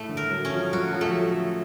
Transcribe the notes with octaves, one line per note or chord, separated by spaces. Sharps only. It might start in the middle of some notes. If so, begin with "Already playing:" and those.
Already playing: A2 A3
D3
A#4
F#3
C#4
F3
F#3 F#4
F3
A3